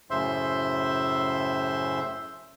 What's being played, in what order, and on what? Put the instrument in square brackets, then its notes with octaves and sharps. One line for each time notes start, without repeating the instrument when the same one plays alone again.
[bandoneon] F#2 A2 C#3 C5 E5 C6